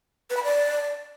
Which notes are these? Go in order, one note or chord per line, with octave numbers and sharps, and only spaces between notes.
B4
B5
D5